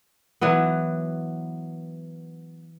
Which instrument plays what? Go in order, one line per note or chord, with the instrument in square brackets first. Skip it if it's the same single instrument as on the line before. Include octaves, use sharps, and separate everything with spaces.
[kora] E3 F#3 B3